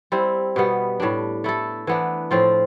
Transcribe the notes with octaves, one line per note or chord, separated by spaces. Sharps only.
G3 C4 E4
B2 G3 B3
A2 G3 D4
A3 E4 A4
E3 B3 D4
A2 F3 C4 F4